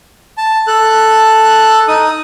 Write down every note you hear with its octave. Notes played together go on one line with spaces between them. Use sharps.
A5
A4 F#6
D#4 D#6